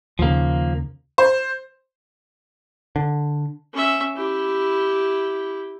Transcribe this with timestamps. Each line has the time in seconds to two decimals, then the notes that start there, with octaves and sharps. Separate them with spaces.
0.19 D#2 C#3 F3 A#3
1.18 C5
2.96 D3
3.73 C#4 E5
4.16 E4 G4